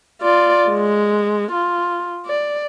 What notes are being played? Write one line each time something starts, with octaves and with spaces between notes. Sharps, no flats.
F4 D5
G#3
F4
D5